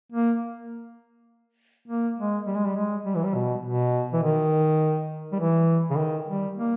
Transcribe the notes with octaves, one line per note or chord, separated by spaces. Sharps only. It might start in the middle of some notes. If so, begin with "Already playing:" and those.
A#3
A#3
G#3
G3
G#3
G3
G#3
G3
E3
G3
B2
B2
E3
D#3
G3
E3
C#3
D#3
G3
A#3